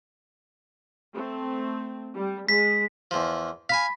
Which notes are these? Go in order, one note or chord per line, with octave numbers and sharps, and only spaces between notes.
A3 C4
G3
G#3 B6
E2 F3
F5 G#5 B5 B6